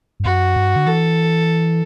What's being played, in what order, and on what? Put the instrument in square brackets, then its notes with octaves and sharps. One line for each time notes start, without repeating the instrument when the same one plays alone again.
[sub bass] G2
[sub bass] F#2 [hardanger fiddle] F#4
[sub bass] G2
D3
[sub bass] E3 [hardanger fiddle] A4